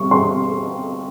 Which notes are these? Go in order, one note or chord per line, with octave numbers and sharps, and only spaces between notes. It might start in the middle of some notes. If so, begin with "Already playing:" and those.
Already playing: G3 C#6
C6